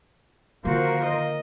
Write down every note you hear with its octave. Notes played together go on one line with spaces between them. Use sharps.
D3 D#3 F3 A#3 F#4 A#4 C5 F5
D#5